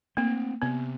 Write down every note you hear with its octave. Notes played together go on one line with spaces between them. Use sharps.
A3 A#3 C4
C3 B3